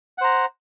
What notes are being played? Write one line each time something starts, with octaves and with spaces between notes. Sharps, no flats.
C5 F#5 A#5